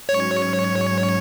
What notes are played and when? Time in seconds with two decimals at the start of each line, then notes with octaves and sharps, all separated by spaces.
0.09 G#2 F#3 C#4 C#5